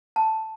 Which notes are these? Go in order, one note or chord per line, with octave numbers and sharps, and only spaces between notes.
A5